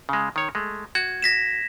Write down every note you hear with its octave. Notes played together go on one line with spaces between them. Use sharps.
C#3 G#3
D#3 C#5
G#3 A3
F#4 G#6
A#6 B6 E7